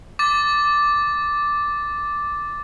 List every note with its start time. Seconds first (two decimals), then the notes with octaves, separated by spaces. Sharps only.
0.19 D6 A6